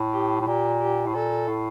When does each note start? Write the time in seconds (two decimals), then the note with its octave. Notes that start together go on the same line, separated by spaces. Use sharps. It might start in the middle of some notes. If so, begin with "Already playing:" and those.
Already playing: A2
0.13 G4
0.40 A2
0.47 A#2 G4
0.81 G4
1.06 A2
1.14 A#2 A4
1.48 A2